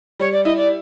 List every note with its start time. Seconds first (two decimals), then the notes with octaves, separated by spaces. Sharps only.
0.20 G3 C#5
0.32 D5
0.44 E4 D#5
0.57 D5